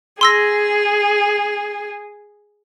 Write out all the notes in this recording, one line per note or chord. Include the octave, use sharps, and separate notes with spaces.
G#4 C6 E6 A#6